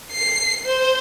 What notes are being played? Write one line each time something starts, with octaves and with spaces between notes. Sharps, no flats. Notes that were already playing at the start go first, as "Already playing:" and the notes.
C7
C5